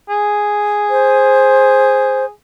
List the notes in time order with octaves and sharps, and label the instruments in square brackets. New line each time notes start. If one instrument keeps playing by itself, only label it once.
[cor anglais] G#4
[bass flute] C5